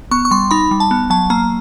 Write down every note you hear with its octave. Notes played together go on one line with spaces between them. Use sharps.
B3 C#6
C#6
G3 C6
D#4 B5
G3
A5
B3
F#3 A5
A#3 A#5